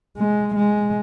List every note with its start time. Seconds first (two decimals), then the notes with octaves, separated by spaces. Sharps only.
0.18 G#3
0.55 G#3